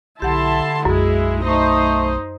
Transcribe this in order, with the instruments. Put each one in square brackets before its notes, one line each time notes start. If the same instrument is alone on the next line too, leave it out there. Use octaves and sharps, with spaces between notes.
[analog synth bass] B1 [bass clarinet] D3 [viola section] E4 A5 C6 [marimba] G4 F#5
[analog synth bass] B1 [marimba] F#2 [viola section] G#3 E4 G#4
[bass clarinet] A3 [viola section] D#4 C5 D#5